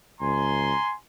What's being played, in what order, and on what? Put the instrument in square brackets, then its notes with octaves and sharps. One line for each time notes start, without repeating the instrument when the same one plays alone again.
[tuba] C#2 [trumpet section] G#5 A#5 C6